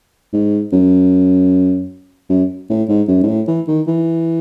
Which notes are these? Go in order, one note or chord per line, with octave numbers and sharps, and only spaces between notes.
G#2
F#2
F#2
A2
G#2
F#2
G#2
A2
E3
D#3
E3